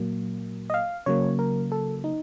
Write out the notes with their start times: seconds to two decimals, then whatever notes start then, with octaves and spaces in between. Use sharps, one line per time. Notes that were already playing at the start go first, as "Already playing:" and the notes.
Already playing: A#2 F#3 A#3
0.70 D#5
0.74 F5
1.06 C#3 F#3 A#3 C#5
1.39 A#4
1.72 A4
2.04 D#4